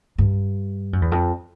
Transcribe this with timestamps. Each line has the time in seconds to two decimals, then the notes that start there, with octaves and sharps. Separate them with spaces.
0.18 G2
0.93 F#2
1.02 E2
1.12 F2